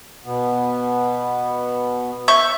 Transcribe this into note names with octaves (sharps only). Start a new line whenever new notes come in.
B2 B3
E5 C#6 G6